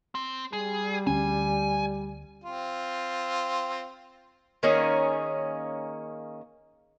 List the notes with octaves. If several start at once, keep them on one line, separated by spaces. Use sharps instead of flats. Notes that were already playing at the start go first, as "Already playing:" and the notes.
C4
G3 G#4
D2 C#4 G#5
C4 F4
D#3 A#3 C#4 G#4